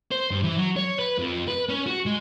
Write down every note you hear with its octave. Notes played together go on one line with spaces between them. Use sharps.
C5
G2
E3
F#3
C#5
B4
F2
B4
C#4
F#4
G#3